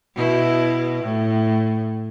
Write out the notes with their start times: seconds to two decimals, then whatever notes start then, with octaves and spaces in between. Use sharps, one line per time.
0.15 B2 E4
1.04 A2